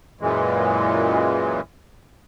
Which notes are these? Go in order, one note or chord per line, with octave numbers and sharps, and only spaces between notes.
F#2 A#2 E3 G#3